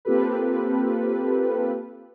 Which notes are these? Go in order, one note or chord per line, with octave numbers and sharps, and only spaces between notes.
A#3 C4 F4 G4 A4 B4